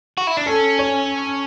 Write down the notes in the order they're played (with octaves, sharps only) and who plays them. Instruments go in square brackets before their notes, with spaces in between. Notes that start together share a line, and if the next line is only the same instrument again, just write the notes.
[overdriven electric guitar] F#4
E4
D4
[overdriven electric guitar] C#4 [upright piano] A4
[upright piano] C#5